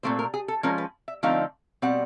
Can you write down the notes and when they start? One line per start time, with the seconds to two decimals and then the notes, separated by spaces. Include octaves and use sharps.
0.03 A#2 F#3 A3 C4 C5
0.19 A#4
0.34 G#4
0.48 A4
0.63 F3 G#3 C#4 A#4
0.78 B4
1.08 E5
1.23 D3 F3 A3 C4 D#4 F5
1.82 B2 G3 C4 F#5